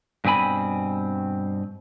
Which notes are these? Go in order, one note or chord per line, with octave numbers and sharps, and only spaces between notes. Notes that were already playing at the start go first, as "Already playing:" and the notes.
G2 B2 C4 G#5 B5